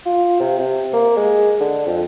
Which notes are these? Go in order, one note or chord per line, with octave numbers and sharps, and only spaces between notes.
F4
C3
C3
A#3
G#3
D3
F2